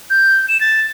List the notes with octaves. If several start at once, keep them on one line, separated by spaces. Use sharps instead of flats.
G6
E7
A6